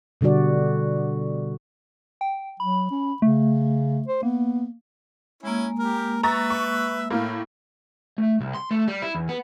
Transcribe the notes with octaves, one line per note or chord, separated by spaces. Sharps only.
B2 D3 G3 F#4 D5
G5
F#3 B5
C#4
C#3 A3
C5
A#3 B3
G#3 A#3 C#4 E4
G4 A#4
B4 E5 A#5 C#6 A6
C#6
A2 A#3 F5
A3
C2
C6
A3
G3
E4
E2
B3